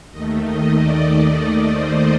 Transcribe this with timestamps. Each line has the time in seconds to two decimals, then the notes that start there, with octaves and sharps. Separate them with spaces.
0.11 D#2 D#3 A3 D#5
0.43 D#5
0.75 D5
1.39 D5
1.71 C5